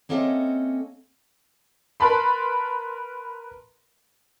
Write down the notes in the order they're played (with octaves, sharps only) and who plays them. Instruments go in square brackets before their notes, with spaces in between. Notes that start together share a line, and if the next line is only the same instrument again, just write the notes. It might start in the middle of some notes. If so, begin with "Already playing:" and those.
[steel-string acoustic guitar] A#3 C4 C#4 A4 D#5 E5
[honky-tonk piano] A#4 B4 A5 B5 C6